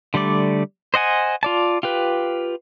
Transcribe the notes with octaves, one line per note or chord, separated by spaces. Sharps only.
D3 G3 A3 D5
C5 D#5 F#5 G#5
F4 D5 A5
F4 G4 B4